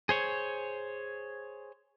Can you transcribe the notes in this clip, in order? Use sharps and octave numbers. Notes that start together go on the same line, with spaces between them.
G#4 C5 C#5